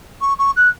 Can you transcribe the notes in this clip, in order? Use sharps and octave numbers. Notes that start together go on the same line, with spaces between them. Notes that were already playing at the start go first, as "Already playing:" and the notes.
C#6
C#6
F#6